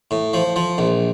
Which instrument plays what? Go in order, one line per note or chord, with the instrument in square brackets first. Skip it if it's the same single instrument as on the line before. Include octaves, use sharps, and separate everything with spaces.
[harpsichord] A2
F3
F3
A#1